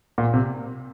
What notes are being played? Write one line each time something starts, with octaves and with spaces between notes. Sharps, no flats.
A#2
C3